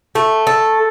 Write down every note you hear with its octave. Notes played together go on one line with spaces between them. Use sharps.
A3
A4